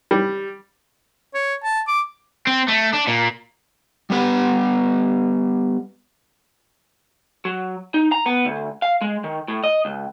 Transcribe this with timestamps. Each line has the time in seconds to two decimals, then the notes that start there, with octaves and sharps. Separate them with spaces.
0.11 G3
1.34 C#5
1.63 A5
1.87 D6
2.47 C4
2.68 A3
2.93 D4
3.07 A#2
4.10 G3 B3 B4 F#5
7.45 F#3
7.94 D#4
8.12 A#5
8.26 B3
8.45 D2
8.82 F5
9.01 G#3
9.24 D#3
9.48 A2
9.64 D#5
9.85 C#2